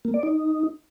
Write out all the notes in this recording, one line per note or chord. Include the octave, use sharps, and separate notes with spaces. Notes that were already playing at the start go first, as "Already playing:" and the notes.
A#3
D5
D#4